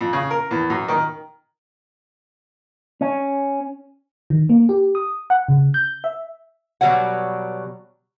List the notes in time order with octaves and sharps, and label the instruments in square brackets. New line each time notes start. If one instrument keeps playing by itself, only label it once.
[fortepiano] F2
C#3
A#4
E2
F#2
D#3
[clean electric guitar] C#4
[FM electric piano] D#3
A#3
G4
D#6
F#5
C#3
G6
E5
[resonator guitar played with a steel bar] B2 F#3 G3 C#5 F#5